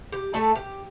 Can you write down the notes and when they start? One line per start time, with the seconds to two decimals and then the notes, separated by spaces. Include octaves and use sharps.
0.12 G4
0.34 A3 A4 E5 A5
0.55 G4